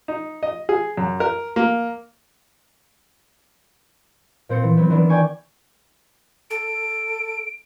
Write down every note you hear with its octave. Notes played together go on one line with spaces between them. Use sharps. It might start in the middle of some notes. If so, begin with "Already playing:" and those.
D#4
D#5
G#4
F#2
A#4
A#3
A#2 C4 C5 A6 C#7
E3
F#3 B3 C4
D#3 E3 B3 D4
D5 G5 G#5 C#6
A4 D7